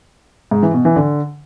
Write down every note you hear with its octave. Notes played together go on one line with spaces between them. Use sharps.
G#2
E3
B2
E3
D3